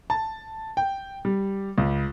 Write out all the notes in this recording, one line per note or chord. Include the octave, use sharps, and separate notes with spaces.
A5
G5
G3
C#2